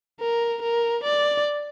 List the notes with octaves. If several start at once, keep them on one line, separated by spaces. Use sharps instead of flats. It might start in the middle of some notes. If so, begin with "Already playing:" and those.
A#4
A#4
D5